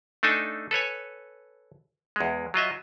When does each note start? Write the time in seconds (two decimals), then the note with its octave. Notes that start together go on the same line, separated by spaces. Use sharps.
0.23 A3 D4 D#4 A4 G#5
0.71 A4 B4 C#5 G#5
2.16 E2 G#3
2.54 F#3 F4 D#5 E5